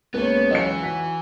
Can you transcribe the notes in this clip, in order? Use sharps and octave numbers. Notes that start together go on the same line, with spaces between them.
C#2 A#3 B3 B4 C#5
E3 F#3 D#5 F5 C#7
F#4 B6